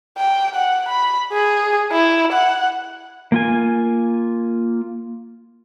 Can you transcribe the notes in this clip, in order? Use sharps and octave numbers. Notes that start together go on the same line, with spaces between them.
G5
F#5
B5
G#4
E4
F#5
A#3 F4 G#5